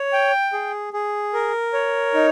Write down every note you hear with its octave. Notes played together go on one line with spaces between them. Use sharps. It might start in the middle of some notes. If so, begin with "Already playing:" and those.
Already playing: C#5
G5
G#4
G#4
A#4
C#5
D#4